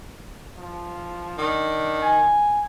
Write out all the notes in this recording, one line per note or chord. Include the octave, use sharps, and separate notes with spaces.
F3
D#3 D4
G#5